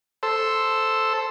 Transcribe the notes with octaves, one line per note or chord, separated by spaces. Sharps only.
A4 C5 E6